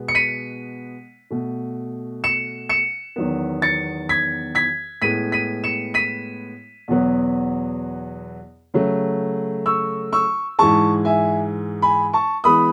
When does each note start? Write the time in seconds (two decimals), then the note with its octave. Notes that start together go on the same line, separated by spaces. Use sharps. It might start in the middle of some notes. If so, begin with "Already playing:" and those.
Already playing: B2 G#3 B3
0.08 C#7
0.15 B6 D#7
1.31 B2 A3
2.24 C#7 E7
2.69 C#7 E7
3.16 E2 D#3 F#3 B3
3.62 A6 C#7
4.09 G#6 B6
4.55 G#6 B6
5.02 A2 G#3 B3 B6 D#7
5.32 B6 D#7
5.64 C#7 E7
5.94 B6 D#7
6.88 E2 B2 F#3 B3
8.74 C#3 F#3 A3
9.66 C#6 E6
10.13 C#6 E6
10.59 G#2 E3 G#3 A5 C#6
11.05 E5 G#5
11.82 G#5 B5
12.13 A5 C#6
12.44 E3 G#3 B3 B5 D#6